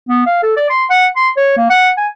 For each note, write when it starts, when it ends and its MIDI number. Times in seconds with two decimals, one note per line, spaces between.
0.09 0.26 59
0.26 0.42 77
0.43 0.54 69
0.57 0.68 74
0.69 0.85 84
0.90 1.06 78
1.16 1.29 84
1.37 1.53 73
1.57 1.66 58
1.70 1.90 78
1.97 2.08 80